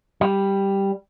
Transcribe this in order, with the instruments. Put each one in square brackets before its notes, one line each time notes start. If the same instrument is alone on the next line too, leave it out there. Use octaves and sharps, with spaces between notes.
[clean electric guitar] G3